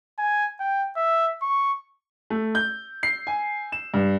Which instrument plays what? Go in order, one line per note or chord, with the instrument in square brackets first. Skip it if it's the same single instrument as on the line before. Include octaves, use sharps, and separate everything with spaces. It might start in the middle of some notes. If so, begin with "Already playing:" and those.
[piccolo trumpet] G#5
G5
E5
C#6
[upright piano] A3
G6
C7
G#5
E7
G2